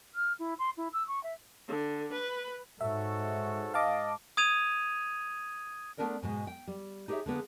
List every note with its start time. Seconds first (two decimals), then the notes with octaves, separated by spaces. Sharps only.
0.15 F6
0.39 E4
0.59 C6
0.77 E4
0.93 E6
1.07 C#6
1.23 E5
1.68 D3
2.12 B4
2.81 G#2 F#4 A4 C#5 E5
3.74 D#5 F5 A5 D6
4.37 D#6 G#6 D#7 F7
5.97 A3 B3 D4 D#4 A#4 D5
6.22 G#2 B2 G#3
6.47 G5
6.67 G3
7.08 D#4 G4 G#4 B4 C#5 E5
7.26 D3 A#3 B3 G#4